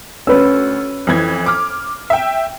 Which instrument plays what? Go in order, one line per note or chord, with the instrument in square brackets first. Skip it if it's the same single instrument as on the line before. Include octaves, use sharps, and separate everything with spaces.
[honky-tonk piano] D2 E6 [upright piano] C#4 B4
[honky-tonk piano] F2 E3 G#6
D6 F6
E5 G5